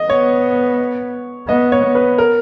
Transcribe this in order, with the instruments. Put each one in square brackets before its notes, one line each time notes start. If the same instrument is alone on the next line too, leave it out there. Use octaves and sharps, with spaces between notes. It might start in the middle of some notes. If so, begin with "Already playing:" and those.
Already playing: [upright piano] D#5
[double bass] B3 [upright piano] C#5
[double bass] B3 [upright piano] D#5
[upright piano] C#5
[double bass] B3
[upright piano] B4
A#4